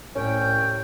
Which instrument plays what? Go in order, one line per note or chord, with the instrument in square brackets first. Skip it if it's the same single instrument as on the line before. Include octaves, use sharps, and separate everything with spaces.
[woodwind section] C2 G5 [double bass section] A2 [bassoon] C#4